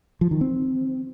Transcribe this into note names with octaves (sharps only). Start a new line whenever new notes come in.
F3
D#3
C4